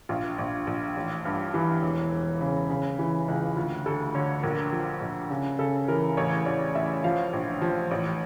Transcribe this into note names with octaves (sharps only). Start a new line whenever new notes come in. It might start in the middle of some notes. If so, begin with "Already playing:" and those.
A#1 F4
A#1
A#1
A1
G2
E3
E1
E1
C#3
C#3
E3
C#2
D2 F4
D2 A4
D3 C#5
A#1 A#4
F3
A#1
C#3
C#3 A4
E3 A#4
A1 C#5
A1 D5
A1 E5
F3 F5
A#1
F3
A1